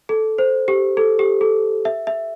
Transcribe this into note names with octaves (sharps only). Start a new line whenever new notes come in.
A4
C5
G4
A4
G4
A4
E5
E5